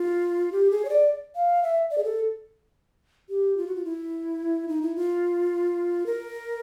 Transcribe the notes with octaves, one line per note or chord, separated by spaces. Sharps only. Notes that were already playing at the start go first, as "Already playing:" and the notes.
Already playing: F4
G4
G#4
C#5
D5
F5
E5
D5
G#4
A4
G4
F4
F#4
F4
E4
D#4
E4
F4
A#4